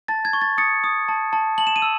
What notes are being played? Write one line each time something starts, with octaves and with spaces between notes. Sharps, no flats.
A5 A6
G#6
C#6
A6
D#6 A6 C#7
D#6
A5
A5
A5 F#7
E7
D#7
E6